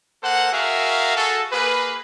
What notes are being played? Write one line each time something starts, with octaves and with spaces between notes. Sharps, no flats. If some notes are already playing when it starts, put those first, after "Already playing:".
A#3 A4 C5 F#5
F#4 G#4 A#4 E5 F5
F#4 G#4 A4
A#3 G#4 B4